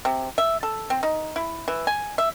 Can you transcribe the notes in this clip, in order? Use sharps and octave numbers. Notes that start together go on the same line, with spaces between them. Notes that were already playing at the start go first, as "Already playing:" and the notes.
C3
E5
A4
C4
D#4
E4
E3
G#5
E5